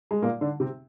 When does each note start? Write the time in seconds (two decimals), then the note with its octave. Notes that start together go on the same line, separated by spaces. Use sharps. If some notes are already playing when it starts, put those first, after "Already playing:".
0.11 G#3
0.23 A#2 A#3
0.41 D3 D4
0.60 C3 C4